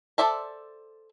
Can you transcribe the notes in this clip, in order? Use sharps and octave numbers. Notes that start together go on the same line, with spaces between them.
A4 C5 D5 E5 A5